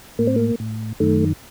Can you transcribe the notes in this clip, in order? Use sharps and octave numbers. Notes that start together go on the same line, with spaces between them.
A2 A#3
C4
A#3
A2
F#2 D#3 A3